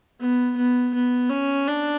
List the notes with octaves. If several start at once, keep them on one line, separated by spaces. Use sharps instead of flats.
B3
B3
B3
C#4
D4